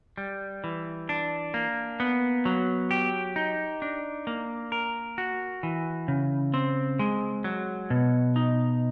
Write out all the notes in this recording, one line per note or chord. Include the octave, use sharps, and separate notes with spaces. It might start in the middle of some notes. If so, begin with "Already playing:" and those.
G3
E3
D4
A#3
B3
F#3
G4
D#4
D4
A#3
A#4
F#4
E3
C#3
C4
G#3
F#3
B2
D#4